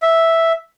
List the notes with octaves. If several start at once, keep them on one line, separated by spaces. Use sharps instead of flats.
E5